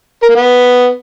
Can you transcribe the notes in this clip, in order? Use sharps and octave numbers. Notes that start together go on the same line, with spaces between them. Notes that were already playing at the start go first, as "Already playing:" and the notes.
A#4
A#3
B3